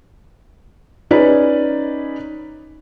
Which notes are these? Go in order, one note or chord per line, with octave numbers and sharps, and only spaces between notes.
C#4 D#4 G#4 B4 D5